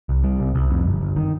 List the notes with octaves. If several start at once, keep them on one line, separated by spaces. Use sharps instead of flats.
C2
G3
C2
C2
F2
G1
G1
D#3